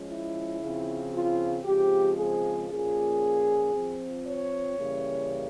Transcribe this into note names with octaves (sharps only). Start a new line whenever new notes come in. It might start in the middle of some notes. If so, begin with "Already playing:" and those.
Already playing: F3 G#3 C#4
E4
C#3 F3 C4
F4
C#3 F3 G#3 C4 G4
G#4
A#2 F3 A#3 C#4 G#4
F3 C4
C#5
C#3 E3 G3 A#3 C#4